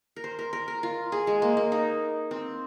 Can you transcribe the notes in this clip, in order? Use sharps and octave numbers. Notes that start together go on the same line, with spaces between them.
A#4
C5
A#4
A#4
A#4
F4
G#4
G#3
A#3
A#3
D#4
C4